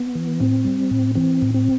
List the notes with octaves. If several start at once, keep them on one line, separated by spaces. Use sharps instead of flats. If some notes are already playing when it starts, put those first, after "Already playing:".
Already playing: B3
E3
A2 C4
G3
A2
E3 C4
A2
C4